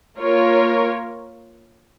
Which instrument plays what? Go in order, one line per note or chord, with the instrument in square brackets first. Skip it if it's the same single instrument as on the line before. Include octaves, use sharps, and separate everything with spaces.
[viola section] A#3 F4 A#4 C#5